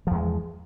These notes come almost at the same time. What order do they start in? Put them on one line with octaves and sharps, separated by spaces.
F3 E2 G#3